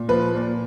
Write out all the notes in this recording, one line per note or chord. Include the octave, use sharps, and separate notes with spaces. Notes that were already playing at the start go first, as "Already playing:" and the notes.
Already playing: A#2
F3 B4
A#2